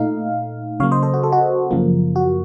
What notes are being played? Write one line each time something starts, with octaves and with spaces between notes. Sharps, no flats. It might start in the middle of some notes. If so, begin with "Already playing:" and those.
Already playing: A#2 A3 D#4 F5
C#3 F#3 A#3 C#5 F5
C5 D#5
A4 C5
F#4
A4
F#4
F#2 C#3 F3 A#3
F#4